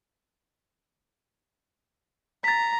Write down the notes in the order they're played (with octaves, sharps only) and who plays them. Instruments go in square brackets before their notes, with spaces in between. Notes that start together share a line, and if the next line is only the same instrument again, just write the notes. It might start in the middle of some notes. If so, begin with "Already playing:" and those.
[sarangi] A#5 [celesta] A6 B6